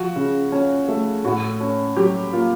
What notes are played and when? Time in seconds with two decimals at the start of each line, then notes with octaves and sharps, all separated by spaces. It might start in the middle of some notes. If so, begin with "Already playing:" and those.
Already playing: F3 F#4
0.16 C#3
0.52 C#4
0.88 A3
1.25 A2 F#4
1.60 C#4
1.97 F#3 G4
2.33 A#3 F4